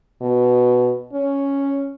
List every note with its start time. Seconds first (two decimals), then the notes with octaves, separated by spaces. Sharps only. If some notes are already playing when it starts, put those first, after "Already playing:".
0.21 B2
1.13 C#4